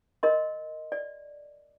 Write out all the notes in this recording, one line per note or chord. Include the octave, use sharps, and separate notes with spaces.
A#4 D#5 C6
D5